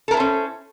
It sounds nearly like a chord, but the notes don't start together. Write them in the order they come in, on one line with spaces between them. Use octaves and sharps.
A4 A#4 E4 C5 C#4